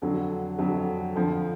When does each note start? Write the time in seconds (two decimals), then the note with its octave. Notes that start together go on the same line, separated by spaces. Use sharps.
0.02 F2 D3 F#3
0.58 F2 D3 F#3
1.15 F2 D3 F3